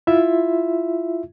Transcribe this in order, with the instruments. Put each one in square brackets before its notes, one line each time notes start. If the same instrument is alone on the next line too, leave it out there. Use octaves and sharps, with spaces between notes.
[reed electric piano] E4 F4 E5